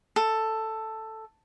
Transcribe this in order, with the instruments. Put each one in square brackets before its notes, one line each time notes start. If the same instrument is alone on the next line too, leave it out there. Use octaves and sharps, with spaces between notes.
[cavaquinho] A4